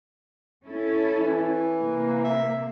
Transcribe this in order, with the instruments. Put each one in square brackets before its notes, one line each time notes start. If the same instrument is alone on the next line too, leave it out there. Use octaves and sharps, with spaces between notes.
[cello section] C#4 E4 A4
[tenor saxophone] E3
[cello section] C3 A#3
[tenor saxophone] E5